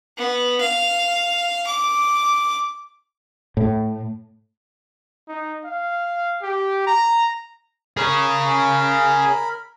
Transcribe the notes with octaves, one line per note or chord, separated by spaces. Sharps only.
B3
F5
D6
A2
D#4
F5
G4
A#5
G#4 A#4 C#5 B5